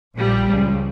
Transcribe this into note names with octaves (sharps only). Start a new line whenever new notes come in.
A#1 A#2 F3 G3
C#2 C#3 F3